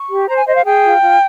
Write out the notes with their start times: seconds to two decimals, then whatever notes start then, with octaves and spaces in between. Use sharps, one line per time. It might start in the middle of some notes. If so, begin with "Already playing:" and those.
Already playing: C#6
0.09 G4
0.27 C5 A#5
0.37 G#5
0.46 C5 D#5
0.55 F5
0.64 G#4 G5
0.83 F4
1.01 F4